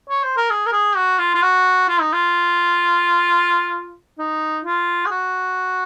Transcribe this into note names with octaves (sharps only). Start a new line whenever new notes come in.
C#5
C5
A#4
G#4
A#4
G#4
F#4
F4
F4
F#4
F4
D#4
F4
D#4
F4
G#4
F#4